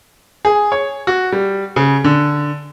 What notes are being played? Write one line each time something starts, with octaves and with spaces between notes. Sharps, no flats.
G#4
C#5
F#4
G3
C#3
D3